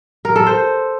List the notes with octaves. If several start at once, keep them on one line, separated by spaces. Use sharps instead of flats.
A#4
A4
C5